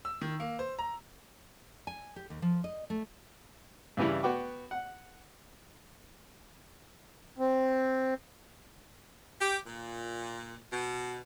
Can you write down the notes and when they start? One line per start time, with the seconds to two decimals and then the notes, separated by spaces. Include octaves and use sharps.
0.05 E6
0.21 D#3
0.40 A#3
0.59 C5
0.79 A#5
1.87 G#5
2.16 G4
2.30 D#2
2.42 F3
2.64 D#5
2.90 A3
3.97 G2 C#3 E3 G3 E4
4.23 B3 F#4 G5 D6
4.71 F#5
7.39 C4
9.40 G4
9.65 A#2
10.72 B2